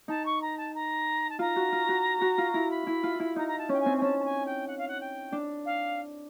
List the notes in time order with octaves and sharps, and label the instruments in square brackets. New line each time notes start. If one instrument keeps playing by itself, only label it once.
[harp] D#4 [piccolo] A5
[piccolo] C#6
A#5
A5
A#5
A5
[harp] F4 [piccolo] A#5
[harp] F#4
F4
F#4
F#4
F4
E4
[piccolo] B5
[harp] E4
F4
E4
[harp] D#4 [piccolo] A#5
[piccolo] A#5
A5
[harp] C#4 [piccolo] G5
[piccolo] G#5
[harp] C4
[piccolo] G#5
[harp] C#4 [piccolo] A5
[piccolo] A5
G#5
G5
F#5
F5
F#5
G5
[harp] D4
[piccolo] F5